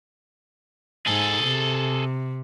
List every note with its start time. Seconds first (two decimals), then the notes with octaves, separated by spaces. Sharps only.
1.07 G#2 G#4 A4
1.43 C3